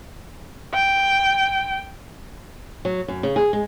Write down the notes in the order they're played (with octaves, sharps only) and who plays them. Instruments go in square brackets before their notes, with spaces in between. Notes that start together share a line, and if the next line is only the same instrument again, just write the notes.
[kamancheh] G5
[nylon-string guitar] F#3
F#2
C#3
G#4
G#3